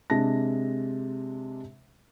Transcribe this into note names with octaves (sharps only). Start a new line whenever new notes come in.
C3 G#3 D4 A5 A#6